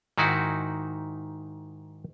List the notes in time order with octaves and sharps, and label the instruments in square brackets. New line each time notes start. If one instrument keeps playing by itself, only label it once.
[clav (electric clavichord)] G#2 D#3 D#4 E4 F#4